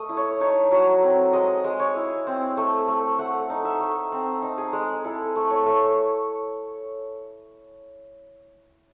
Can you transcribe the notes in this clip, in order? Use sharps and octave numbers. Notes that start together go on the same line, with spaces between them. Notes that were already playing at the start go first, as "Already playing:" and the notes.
Already playing: A3 D#5
E4
C#5
D#4 C#5
F#3
C4
G#3 D#5
G#3
C#5
E4
C4
A3
A3
A3 F#5
D#4
E5
A3
C4
D#4
G#4
G#3
E4 A4
A3
C#5
A3